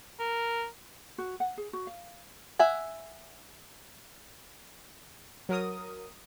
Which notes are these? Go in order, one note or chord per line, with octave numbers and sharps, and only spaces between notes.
A#4
F#4
F#5
G#4
F#4
F5
E5 F#5 G#5
F#3 A#4 D#6